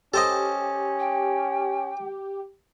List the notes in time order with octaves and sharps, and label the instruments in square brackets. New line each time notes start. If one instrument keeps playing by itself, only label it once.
[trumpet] C#4 [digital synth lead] G4 [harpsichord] A4 C5 D#5
[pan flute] G5